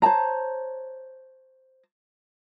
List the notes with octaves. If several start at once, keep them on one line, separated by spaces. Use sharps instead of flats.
C5 C#5 A5 A#5